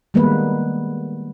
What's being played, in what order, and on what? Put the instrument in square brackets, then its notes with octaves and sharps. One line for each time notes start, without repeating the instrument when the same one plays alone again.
[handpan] D#3 G3 G#3 A#3 B3 B4